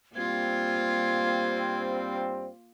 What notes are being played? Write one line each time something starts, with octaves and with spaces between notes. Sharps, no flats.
G2 G3 A#3 C4 F4 G#6